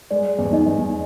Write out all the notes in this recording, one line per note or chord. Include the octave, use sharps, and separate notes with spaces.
G#3 D5
E2
D#4 D#5
E2